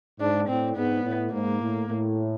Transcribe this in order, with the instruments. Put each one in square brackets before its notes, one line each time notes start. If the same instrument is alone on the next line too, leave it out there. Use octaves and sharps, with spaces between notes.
[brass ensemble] G#2 [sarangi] D4
[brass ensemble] A2 [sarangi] C4
[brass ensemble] G#2 [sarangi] B3
[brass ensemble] A2
[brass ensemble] G#2 [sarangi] A#3
[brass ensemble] A2
A2